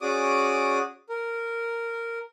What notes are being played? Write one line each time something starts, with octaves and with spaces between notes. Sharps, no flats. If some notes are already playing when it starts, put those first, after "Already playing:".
C#4 F#4 G#4 D5 D6 D#6
A#4